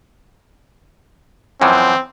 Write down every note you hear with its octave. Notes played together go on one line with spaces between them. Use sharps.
F#2 E3 F3 C4